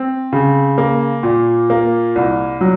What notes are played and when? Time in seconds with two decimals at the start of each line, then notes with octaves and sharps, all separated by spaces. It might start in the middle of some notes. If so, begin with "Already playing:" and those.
Already playing: C4
0.33 C#3
0.78 A#3
1.23 A#2
1.70 A#3
2.16 C2
2.61 F#3